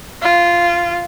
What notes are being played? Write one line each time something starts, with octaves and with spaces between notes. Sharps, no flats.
F4